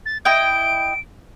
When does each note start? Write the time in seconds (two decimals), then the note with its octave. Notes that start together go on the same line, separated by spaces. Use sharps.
0.06 A6
0.25 E4 D#5 G5 D7